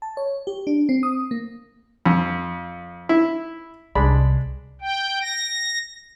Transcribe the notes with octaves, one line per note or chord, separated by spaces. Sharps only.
A5
C#5
G4
D4
C4
D#6
A#3
F2
E4
C2 G#3 D4 B5
G5
A#6